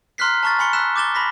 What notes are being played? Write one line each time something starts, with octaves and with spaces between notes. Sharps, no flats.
A#5 C6 F6 F#6 B6 C7
A5 A#5 C#6 F6 A6
G#5 B5 C6 C#7 G7
E6 F#6 B6 C#7 E7
D6 G6 A6 E7 G7
B5 A#6 B6